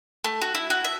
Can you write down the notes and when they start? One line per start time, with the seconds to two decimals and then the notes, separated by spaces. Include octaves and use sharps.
0.24 A3
0.41 F#4
0.55 E4
0.70 F#4
0.84 E5